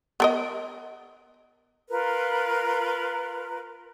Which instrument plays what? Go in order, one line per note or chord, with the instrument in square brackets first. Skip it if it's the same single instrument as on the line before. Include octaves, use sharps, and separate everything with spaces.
[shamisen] B3 A#4 D#5
[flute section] F4 A#4 B4